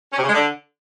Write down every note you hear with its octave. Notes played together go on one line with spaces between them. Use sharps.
C#4
C3
C#3
G#3
D3